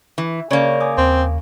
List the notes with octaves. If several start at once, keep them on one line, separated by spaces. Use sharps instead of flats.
E3
C#3 A#3 C#5 D5
G#5 D6 D#6
D#2 C4